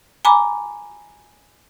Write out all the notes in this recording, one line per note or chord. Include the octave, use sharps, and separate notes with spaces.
G#5 A#5 B5 D6